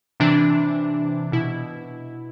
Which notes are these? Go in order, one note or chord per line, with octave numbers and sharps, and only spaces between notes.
C3 E3 D4
B2 E4